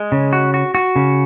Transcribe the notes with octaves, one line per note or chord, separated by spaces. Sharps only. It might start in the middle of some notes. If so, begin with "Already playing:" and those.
Already playing: G#3
C#3
F#4
F#4
F#4
C#3